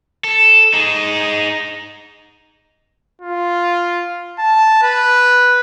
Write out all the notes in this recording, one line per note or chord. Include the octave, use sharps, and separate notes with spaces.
A4
D#4 G#4
F4
A5
B4